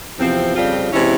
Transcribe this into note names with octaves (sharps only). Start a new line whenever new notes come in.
E2 C3 F3 C4
F2 C#3 G3 C4 F4
C3 E3 G#3 C#4 E4